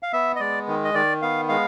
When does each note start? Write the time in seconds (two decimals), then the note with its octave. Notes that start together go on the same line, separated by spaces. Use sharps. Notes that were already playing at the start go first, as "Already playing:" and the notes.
0.03 F5
0.13 B3 E5
0.36 D#5
0.40 G#3 D5
0.68 D#3
0.85 D#5
0.94 D#3 D5
1.22 B3 F5
1.49 G#3 F5